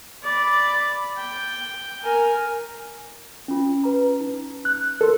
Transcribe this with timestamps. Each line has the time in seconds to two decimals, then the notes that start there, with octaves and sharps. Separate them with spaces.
0.23 D5 B5
1.18 G5
2.03 A#4 G#5
3.48 C#4 F4
3.84 B4 A#5
4.21 D#4
4.65 F#6
5.01 A4 A#4 C6